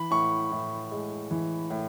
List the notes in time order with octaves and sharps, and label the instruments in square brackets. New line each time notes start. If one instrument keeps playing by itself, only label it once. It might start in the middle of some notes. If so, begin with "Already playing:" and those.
Already playing: [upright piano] E3 [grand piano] B5
[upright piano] A2 [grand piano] C#6
[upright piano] A2
G#3
E3
A2